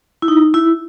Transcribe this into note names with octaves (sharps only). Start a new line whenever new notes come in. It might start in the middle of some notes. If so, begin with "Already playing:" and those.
E4
D#4
E4